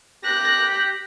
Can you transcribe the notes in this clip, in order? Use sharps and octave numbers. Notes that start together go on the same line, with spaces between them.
G4 F#6 A#6